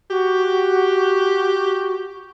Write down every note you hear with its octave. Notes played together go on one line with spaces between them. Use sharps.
F#4 G4